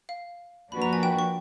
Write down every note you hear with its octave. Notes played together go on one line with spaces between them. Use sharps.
F5
F3 A#3 D4 F#4 B4 B5
A#5
G#5
G5
C#6